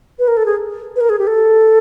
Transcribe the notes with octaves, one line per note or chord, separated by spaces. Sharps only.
B4
A#4
A4
G#4
B4
A#4
G#4
G4
A4